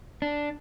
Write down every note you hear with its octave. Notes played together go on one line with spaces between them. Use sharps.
D4